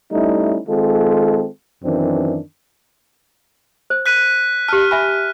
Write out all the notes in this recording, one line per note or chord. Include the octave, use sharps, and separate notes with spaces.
G3 A3 C#4 D#4 E4
D#3 G#3 C4 F4 A4
F#2 D#3 E3 C4 D4
C5
F#6 B6 D#7
G4 A5 F6
E5 G#5 B5